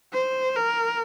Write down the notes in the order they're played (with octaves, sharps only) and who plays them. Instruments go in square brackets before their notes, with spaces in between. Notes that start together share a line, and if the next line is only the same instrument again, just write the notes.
[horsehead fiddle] C5
A#4